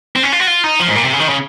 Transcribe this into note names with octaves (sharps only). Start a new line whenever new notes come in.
C4
C#4
F4
F#4
F4
D#4
F3
G#2
A#2
C3
C#3
D#3
C#3